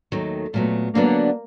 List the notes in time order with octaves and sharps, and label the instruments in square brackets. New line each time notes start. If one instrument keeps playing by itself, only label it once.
[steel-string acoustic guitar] D#2 D#3 F#3 A3
[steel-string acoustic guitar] A#2 F#3 B3 [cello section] A3
[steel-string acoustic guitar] D3 F#3 B3 D4 [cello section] A#3